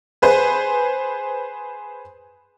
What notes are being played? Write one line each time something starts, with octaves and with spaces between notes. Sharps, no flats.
G#4 B4 C5